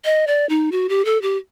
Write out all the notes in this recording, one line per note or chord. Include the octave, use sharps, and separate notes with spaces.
D#5
D5
D#4
F#4
G4
A4
G4